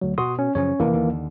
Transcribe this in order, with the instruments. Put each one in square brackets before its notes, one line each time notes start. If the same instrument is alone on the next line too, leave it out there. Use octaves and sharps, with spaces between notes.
[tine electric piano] D2 F#3
[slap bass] B2 [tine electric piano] F#4 C6 D#6
[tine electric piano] C#4
[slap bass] F#2 C#3 F3 [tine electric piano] C#4 C#5
[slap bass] F1 E2 B2 [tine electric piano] E3 A#3
[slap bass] D#2 D3